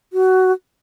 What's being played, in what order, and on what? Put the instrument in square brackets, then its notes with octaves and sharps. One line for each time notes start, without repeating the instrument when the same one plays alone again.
[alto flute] F#4